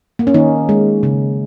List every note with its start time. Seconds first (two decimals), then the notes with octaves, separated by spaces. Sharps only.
0.19 A#3
0.27 C#4
0.34 D#3 A#3 D#4
0.69 G#3
1.03 C#3